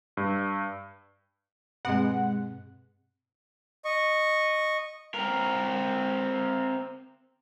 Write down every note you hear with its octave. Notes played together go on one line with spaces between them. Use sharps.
G2
G2 B2 G#3 C4 F#5
D#5 C#6
C4 A#4